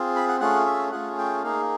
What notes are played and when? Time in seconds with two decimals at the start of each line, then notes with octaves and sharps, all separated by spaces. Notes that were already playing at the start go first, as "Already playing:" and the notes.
Already playing: C4 F4 G#4
0.16 B5
0.28 F#5
0.40 A3 C#4 F4 G#4 F#5
0.66 E5
0.92 A3 C#4 F4 G#4 F#5
1.18 G5
1.43 A#3 D#4 G#4 F5